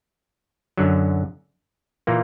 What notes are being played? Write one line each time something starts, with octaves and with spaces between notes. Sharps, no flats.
F#2 D3 F#3
A#2 E3 A#3